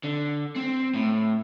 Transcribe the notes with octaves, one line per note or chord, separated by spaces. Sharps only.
D3
C4
A2